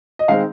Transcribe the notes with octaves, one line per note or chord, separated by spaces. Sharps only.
D#5
D#3 G#3 C4 F5